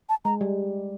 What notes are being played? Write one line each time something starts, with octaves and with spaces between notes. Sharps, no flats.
A5
G#3 A#5
G3